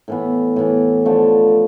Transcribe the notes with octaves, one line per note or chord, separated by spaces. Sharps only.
A2 E3 B3
A2 E3 B3
D3 F3 A3